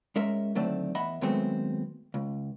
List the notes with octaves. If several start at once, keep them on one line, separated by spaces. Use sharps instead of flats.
G#3 C#4 A#4 E5
D2 D#3 F#3 A3 C4 D4
E2 D#5 E5 F#5 B5
D#2 F#3 G#3 A3 B3 C4
C#2